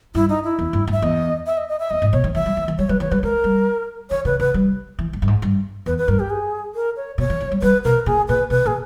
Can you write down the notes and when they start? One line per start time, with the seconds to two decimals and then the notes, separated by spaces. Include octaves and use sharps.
0.15 G2 E4
0.29 D#4
0.44 E4
0.59 E2
0.73 G2
0.87 G2
0.92 E5
1.02 E2 D#5
1.46 E5
1.57 D#5
1.69 D#5
1.79 E5
1.90 E2 D#5
2.02 G#2
2.13 B2 C#5
2.24 D#3
2.34 E3 E5
2.46 G3
2.57 E3
2.68 E3
2.78 G3 C#5
2.89 G3 B4
3.00 E3 C#5
3.11 G3 B4
3.23 G#3 A#4
3.44 G3
4.10 D#3 C#5
4.25 C#3 B4
4.40 C#3 B4
4.54 G3
4.99 E3
5.13 G#2
5.22 G2
5.28 G#2
5.42 G2
5.86 E2 B4
5.98 B4
6.08 G2 A#4
6.19 G4
6.30 G#4
6.75 A#4
6.96 C#5
7.18 B2 C#5
7.30 D#3
7.40 E3
7.52 G3
7.62 G3 B4
7.84 B2 A#4
8.06 A#2 G#4
8.28 A#2 B4
8.50 B2 B4
8.66 A#2 G#4